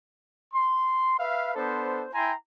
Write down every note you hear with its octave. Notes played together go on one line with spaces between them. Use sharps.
C6
B4 E5 F5
B3 D4 A4 C5
E4 G5 G#5 A#5 C6